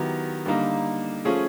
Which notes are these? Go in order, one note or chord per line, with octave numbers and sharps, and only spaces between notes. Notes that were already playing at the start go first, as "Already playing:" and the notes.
Already playing: D#3 F#3 B3 E4 G4
D3 G3 A#3 D#4
F3 A3 C#4 F4 G#4